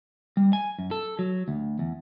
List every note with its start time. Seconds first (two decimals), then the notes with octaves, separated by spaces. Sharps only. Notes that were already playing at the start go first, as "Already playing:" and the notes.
0.37 G3
0.53 G#5
0.79 F#2
0.91 A4
1.19 F#3
1.48 D2
1.79 E2